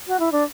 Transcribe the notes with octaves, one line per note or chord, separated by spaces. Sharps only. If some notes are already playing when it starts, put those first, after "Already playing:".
F#4
E4
D4